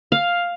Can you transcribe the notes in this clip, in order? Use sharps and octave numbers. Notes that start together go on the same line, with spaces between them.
F5